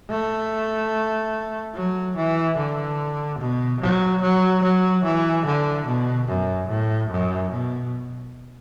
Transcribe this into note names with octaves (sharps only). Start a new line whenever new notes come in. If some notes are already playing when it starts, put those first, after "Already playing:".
A3
F#3
E3
D3
B2
F#3
F#3
F#3
E3
D3
B2
F#2
A2
F#2
B2